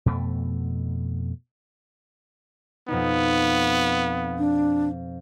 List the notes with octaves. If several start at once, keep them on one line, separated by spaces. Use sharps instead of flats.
F2 B2 A3
F2 B2 B3 D#4
D4